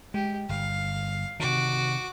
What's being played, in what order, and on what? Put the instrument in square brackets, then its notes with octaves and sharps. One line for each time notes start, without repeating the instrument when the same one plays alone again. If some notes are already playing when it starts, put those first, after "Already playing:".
[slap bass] G#3 [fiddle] G4
[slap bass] G1 [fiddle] F5
[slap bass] C3 D#3 [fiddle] F#4 D6